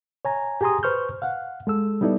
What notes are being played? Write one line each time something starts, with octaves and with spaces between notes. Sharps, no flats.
C#5 G#5 A#5
G4 G#4 G#5 A#5 C6 D#6
B4 C5 C#6 F6 G6
F5 F#5
G#3 A4 E6
G3 B3 D#4 E4 A4 D5